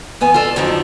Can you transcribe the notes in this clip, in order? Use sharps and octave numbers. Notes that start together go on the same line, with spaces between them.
E2 B3 G#5
F4 A4 D5
F2 D3 D#3 F3 F#3 D4